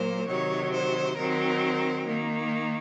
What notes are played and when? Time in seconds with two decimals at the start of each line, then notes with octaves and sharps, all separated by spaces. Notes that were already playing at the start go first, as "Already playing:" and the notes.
Already playing: A#2 F#3 A#3 C5
0.28 C3 D#3 F#3 C#5
0.72 C5
1.17 D#3 F#3 C4 A#4
2.06 D#3 A#3